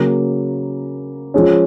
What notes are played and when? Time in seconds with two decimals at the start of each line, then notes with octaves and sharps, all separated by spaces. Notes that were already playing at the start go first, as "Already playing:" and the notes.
Already playing: C#3 F#3 A#3
1.34 F3 G#3 C#4